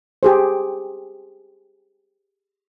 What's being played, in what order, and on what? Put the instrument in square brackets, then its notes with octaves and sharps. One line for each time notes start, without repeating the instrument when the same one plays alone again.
[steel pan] G4 G#4 C5